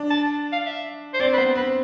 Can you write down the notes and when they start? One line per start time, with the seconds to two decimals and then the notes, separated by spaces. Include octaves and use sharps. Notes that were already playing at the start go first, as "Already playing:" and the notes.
Already playing: D4
0.10 A5
0.52 F5
0.66 E5
1.14 C5
1.20 C4 D5
1.33 B4
1.38 B3 C5
1.56 C4 B4